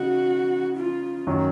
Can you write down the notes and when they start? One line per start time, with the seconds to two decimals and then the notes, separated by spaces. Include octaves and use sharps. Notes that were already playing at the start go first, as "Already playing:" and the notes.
Already playing: C#3 D#4 F#4
0.78 F4
1.27 F#2 D#3 F#3